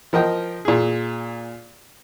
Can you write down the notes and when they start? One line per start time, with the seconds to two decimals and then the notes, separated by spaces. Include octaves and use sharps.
0.13 F3 A#4 D#5 G5
0.65 A#2 G#4